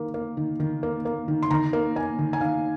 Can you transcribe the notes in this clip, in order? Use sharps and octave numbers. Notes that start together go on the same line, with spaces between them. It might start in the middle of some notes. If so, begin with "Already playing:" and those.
Already playing: D#3 A#3
A#3
D#3
D#3
A#3
A#3
D#3
C6
D#3 A#5
A#3
A#3 G#5
D#3
G#5
D#3 F5